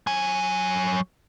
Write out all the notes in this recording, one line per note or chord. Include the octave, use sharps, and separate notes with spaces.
F#3 G#5